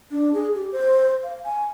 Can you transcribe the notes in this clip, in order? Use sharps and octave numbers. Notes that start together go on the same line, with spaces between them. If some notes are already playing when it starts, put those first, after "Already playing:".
D4
G#4
G4
C5
F5
G#5